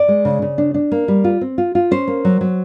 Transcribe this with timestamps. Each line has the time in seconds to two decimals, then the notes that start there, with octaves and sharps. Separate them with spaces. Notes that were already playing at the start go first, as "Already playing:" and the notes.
Already playing: D5
0.08 G#3
0.25 C#3
0.42 C#3
0.58 D4
0.74 D4
0.92 A#3
1.08 G3
1.24 F4
1.41 C4
1.58 F4
1.75 F4
1.91 C#4 C5
2.08 A#3
2.25 F#3
2.41 F#3